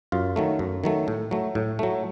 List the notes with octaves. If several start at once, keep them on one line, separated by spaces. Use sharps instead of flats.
F#2 F4
D#3 F#3 A3
F#2
D#3 F#3 A3
A2
F#3 A3
A2
F#3 A3